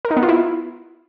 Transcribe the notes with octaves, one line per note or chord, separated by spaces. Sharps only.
A#4
D#4
B3
F4
E4